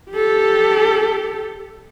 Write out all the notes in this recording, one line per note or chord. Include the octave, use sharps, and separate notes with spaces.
G4 A4